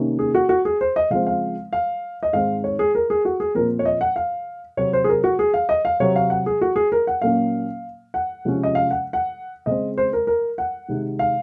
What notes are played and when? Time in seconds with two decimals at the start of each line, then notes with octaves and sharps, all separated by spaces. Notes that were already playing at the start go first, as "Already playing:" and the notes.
Already playing: C3 D#3 A#3 C#4
0.19 G#4
0.35 F#4
0.49 F#4
0.65 G#4
0.81 C5
0.96 D#5
1.10 C#3 F3 G#3 C4 F5
1.27 F5
1.73 F5
2.23 D#5
2.33 G#2 D#3 G#3 C4 F5
2.64 C#5
2.79 G#4
2.95 A#4
3.10 G#4
3.25 F#4
3.40 G#4
3.55 A#2 F3 C4 A#4
3.79 C#5
3.85 D#5
4.01 F#5
4.16 F5
4.77 C3 F#3 C4 C#5
4.93 C5
5.04 G#4
5.09 A#4
5.24 F#4
5.39 G#4
5.54 F5
5.69 D#5
5.85 F5
6.00 C3 F#3 C4 C#5
6.16 F5
6.30 F#5
6.46 G#4
6.61 F#4
6.76 G#4
6.92 A#4
7.07 F#5
7.22 A#2 F#3 A#3 C#4 F5
8.14 F#5
8.45 C3 F3 G#3 C#4
8.63 D#5
8.75 F5
8.91 F#5
9.13 F#5
9.66 C#3 G#3 C4 D#5
9.98 C5
10.13 A#4
10.27 A#4
10.58 F#5
10.88 C3 D#3 G#3
11.19 F5